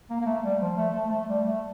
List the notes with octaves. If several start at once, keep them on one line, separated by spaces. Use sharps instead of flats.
A#3
A#3
A3
G3
F3
A3
A3
A3
G3
A3